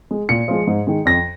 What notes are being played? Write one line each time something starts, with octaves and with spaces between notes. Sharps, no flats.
G#3
A#2 C#7
F3 G#3
G#2
D#3 G#3
F2 A#6